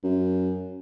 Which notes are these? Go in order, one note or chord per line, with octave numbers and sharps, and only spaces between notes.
F#2